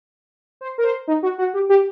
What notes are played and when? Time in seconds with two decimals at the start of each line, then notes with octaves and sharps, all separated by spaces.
0.61 C5
0.78 A#4
0.84 C5
1.07 D#4
1.23 F#4
1.38 F#4
1.54 G4
1.69 G4